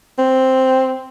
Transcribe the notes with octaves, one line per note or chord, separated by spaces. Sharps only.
C4